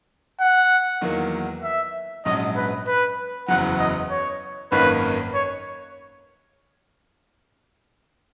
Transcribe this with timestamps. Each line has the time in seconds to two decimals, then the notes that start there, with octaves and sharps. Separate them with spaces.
0.40 F#5
1.01 E2 D#3 F#3 A#3
1.63 E5
2.25 A#1 G#2 F#3 C#4 D#5
2.56 B4
2.87 B4
3.48 F#1 E2 C#3 F#3 F#5
3.79 D#5
4.10 C#5
4.72 G#1 F#2 D#3 A#3 C#4 B4
5.34 C#5